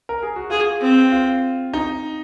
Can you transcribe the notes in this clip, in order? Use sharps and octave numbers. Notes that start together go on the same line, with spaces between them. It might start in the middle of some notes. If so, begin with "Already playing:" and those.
A#4
G#4
F#4
F4 G#4
C4
F4
D#4